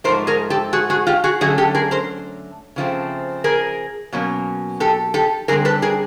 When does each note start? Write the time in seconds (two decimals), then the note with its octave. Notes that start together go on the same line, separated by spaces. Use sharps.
0.04 G#2 F3 A3 A#4 C5
0.27 G#4 A#4
0.50 G4 A4
0.73 F#4 G#4
0.90 F#4 G#4
1.07 F4 G4
1.24 F#4 G#4
1.41 D3 F#3 A3 C#4 F#4 G#4
1.58 G4 A4
1.75 G#4 A#4
1.91 A#4 C5
2.76 C#3 F3 A3 C4
3.44 G#4 A#4
4.13 B2 F#3 A#3 C#4
4.80 G4 A4
5.14 G4 A4
5.48 D3 G3 C4 G#4 A#4
5.65 A4 B4
5.82 G#4 A#4